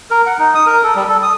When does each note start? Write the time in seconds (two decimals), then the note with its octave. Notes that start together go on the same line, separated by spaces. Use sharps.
0.11 A#4
0.26 F#5
0.39 D#4
0.55 D#6
0.66 A#4
0.83 A4
0.95 G3
1.09 A4
1.23 D#6